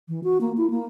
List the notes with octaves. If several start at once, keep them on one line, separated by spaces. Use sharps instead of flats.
E3
F#4
A#3
E4
A#3